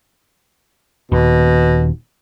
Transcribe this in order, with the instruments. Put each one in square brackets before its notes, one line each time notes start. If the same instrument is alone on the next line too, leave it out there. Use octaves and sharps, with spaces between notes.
[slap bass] D#1 D#2 [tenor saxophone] B2